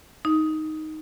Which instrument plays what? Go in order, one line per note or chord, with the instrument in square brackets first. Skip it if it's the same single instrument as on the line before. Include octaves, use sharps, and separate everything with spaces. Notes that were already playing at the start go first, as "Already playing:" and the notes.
[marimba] D#4